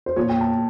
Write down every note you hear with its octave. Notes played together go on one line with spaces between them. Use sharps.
C5
A#2 F3 C#5
G5
A5